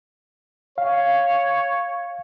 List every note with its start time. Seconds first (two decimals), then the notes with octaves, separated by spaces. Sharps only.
0.78 C#5 F5